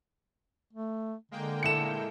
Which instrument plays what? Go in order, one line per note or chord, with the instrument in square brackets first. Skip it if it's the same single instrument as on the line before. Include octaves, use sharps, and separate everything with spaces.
[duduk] A3
[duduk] D3 [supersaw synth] G#3 A#3 G5
[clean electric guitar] A#2 E4 A4 [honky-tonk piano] C#7 E7